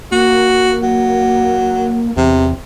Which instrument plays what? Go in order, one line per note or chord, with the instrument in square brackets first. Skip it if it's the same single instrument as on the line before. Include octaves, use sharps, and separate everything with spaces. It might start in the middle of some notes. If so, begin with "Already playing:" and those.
[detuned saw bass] A#3 [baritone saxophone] F#4
[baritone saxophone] F#3
[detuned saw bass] E2 [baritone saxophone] C3